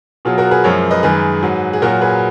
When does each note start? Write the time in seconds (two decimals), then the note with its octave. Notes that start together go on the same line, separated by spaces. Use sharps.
0.25 B2 F#3 F4 G#4
0.38 F#4 A#4
0.51 G#4 B4
0.64 F#2 F3 G#3 A#4 C#5
0.91 B4 D#5
1.03 F#2 D#3 G#3 G#4 B4
1.43 G#2 F#3
1.73 G#4
1.82 A#2 F#3 F#4 A#4
2.01 G#4 B4